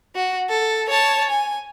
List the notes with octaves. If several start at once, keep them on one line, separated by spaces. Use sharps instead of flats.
F#4
A4
C#5 A5
G#5